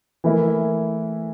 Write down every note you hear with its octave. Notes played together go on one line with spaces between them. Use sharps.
E3 A3 E4 A#4